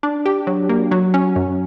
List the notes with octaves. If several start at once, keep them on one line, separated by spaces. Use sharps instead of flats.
D4
G4
F#3
A#3
F#3
C#4
F#2